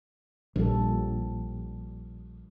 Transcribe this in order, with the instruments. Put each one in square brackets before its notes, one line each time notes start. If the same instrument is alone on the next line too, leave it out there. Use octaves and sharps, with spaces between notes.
[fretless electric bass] A#1 [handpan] F3 G3 A4